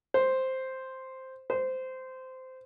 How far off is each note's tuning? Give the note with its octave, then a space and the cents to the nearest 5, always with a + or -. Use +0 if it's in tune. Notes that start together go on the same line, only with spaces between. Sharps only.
C5 +0
C5 -15